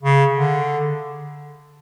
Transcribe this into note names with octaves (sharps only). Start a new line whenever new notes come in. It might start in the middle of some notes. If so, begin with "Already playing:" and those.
C#3
D3